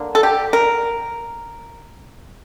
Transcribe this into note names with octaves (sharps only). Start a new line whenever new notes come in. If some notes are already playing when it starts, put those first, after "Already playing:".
Already playing: D3 A#3
A4
G4
A#4